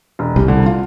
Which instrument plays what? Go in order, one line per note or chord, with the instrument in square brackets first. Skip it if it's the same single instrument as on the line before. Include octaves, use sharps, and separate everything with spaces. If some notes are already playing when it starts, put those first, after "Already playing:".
[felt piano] E1
[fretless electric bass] C2 [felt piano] G3
[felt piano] D3
F4